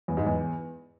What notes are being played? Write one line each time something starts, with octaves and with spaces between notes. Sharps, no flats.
E2
G#2
E2